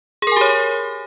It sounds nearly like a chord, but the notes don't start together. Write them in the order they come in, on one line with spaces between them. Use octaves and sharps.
G#4 A#4 G#5 G4 C#5